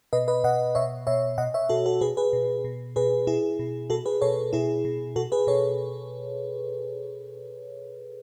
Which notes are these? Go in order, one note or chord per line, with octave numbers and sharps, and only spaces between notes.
B2 B4 D#5
B4 D#5
B2 D#5 F#5
B2 C#5 E5
B2 C#5 E5
B2 D#5 F#5
C#5 E5
B2 F#4 A4
F#4 A4
B2 G#4 B4
G#4 B4
B2
B2
B2 G#4 B4
B2 E4 G#4
B2
B2 F#4 A4
G#4 B4
B2 A4 C#5
B2 E4 G#4
B2
B2 F#4 A4
G#4 B4
B2 A4 C#5